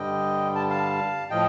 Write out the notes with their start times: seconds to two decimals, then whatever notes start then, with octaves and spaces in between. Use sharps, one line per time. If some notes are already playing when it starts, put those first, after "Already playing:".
Already playing: G2 D3 G3 D#5 G5
0.55 A5
0.70 F5 A5
1.30 A2 F3 D#5 G5